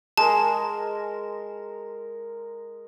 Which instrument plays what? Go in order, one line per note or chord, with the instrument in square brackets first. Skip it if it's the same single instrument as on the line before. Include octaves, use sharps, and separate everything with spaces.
[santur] G#3 A#4 [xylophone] A5